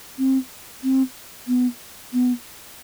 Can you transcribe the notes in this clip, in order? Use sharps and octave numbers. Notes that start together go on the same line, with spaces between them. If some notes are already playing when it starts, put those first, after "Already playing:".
C4
C4
B3
B3